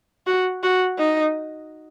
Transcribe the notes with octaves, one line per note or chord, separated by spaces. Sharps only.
F#4
F#4
D#4